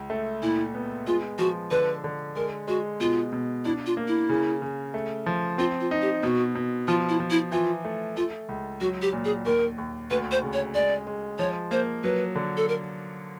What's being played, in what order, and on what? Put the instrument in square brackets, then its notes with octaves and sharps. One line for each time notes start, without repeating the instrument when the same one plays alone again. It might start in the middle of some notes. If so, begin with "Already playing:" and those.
Already playing: [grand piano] C#2
A3
[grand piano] A#2 [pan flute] E4
[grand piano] B3
[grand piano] G#3 [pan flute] F4
[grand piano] F3 [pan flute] F#4
[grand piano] D3 [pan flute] B4
[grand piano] D3
[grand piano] G#3 [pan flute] A#4
[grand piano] G#3 [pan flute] F#4
[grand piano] B2 [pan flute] F4
[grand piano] B2
[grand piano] D4 [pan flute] E4
[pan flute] F4
[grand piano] A#3
[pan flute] E4
[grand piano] C#3
C#3
A3
F3
[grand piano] C4 [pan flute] F4
[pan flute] F4
[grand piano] D#4
[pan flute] G4
[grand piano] B2 [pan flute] F#4
[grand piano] B2
[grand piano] F3 [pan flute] F4
[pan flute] E4
[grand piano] F3
[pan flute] E4
[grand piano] E3 [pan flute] F4
[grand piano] A3
[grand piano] A3 [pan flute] F4
[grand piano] C#2
[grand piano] F#3 [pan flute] F#4
[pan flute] G4
[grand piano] A#2
[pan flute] G#4
[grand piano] D#2 [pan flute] A#4
[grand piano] D#2
[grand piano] D2 [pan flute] B4
[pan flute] C5
[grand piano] C#3
[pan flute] C#5
[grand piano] G#3 [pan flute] D5
[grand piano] G#3
[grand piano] F3 [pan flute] C#5
[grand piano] A#3 [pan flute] C5
[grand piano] F#3 [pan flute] B4
[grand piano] D3
[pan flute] A4
A#4